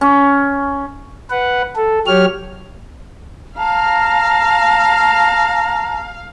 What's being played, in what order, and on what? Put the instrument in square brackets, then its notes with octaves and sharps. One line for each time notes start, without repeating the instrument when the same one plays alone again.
[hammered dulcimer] C#4
[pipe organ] B4 F#5
A4
F#3 G4 C#5 F6
[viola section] F5 [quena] A5 [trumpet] A#5